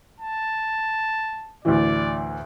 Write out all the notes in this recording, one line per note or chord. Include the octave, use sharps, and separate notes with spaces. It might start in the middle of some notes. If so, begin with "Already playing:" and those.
A5
D2 A2 E3 D5